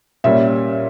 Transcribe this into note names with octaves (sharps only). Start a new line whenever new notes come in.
A#2 G3 C#4 E5